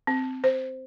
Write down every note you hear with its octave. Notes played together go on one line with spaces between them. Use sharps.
C4
C5